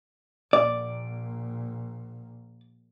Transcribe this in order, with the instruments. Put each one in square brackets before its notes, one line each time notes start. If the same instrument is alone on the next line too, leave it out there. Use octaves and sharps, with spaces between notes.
[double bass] A#1 A#2 [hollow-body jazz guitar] D5